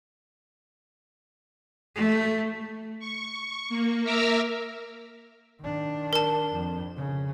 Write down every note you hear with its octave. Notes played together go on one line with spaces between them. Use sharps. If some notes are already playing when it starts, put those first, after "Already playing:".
A3
C#6
A#3
A#4 E5 A#5 D6 E6 F6
D#3 D4
A#4 A5
F2
C#3